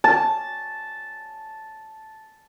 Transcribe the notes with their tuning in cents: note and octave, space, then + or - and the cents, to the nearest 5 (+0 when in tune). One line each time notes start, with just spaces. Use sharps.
A5 -5